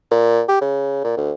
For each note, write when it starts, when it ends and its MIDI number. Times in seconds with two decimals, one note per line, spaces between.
0.11 0.42 46
0.49 0.61 67
0.61 1.01 49
1.04 1.16 46
1.17 1.32 38